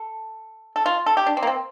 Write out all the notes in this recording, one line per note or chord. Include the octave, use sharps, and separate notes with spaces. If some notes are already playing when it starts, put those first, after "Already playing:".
Already playing: A4
A4
F4
A4
G4
D4
C4
A#3
C4